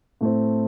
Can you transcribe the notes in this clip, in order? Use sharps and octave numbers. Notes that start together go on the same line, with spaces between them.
A2 A3 C4